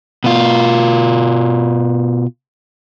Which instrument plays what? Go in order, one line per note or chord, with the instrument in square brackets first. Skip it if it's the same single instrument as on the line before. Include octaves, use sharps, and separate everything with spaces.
[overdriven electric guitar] B2 F4